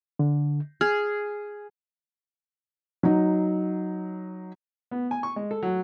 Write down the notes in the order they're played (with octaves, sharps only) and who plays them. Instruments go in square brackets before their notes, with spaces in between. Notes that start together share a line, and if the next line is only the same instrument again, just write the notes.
[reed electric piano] D3
[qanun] G#4 [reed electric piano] F6
[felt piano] F#3 D#4
[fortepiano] B3
G#5
C#6
G#3
A4
F#3